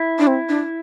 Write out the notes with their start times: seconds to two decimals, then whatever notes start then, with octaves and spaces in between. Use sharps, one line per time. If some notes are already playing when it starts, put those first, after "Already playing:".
Already playing: E4
0.19 D4
0.27 C4
0.49 D4